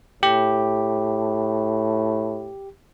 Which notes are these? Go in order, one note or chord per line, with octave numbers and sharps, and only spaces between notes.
A2 G4